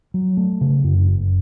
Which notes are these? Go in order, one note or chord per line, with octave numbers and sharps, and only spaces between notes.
F#3
A3
C#3
F#2
F#1